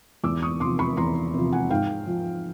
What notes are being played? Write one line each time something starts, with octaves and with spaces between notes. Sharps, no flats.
E2 D6 E6
C#6 D#6
C3 F3 C6 D6
B5 C#6
E2 A#5 C6
C3 F3
F#5 G#5
G#2 F5 G5
F3